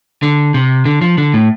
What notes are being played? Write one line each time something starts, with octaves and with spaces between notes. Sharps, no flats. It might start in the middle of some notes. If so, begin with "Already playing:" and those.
D3
C3
D3
F3
D3
A2